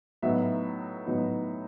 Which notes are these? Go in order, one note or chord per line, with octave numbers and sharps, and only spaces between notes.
A2 F#3 B3 D#4 E5
A2 F#3 B3 D#4